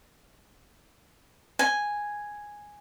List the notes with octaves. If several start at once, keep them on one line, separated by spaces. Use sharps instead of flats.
G#5